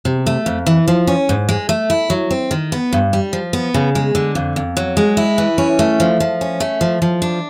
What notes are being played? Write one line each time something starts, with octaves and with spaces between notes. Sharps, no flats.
C3
A3
F2
E3
F3
C#4
G#2
G#3
A3
E4
F#3
C4
D#3
B3
G2
G3
F3
B3
C#3
G#3
D3
F2
F2
F#3
G#3
E4
E3
C#4
A3
F3
F3
C#4
A3
F3
F3
D4